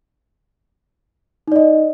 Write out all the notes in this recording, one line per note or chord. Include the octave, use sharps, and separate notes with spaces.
D#4 D5 D#5